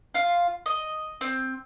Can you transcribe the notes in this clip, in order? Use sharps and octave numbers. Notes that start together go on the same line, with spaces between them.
F4 F5
D#5
C4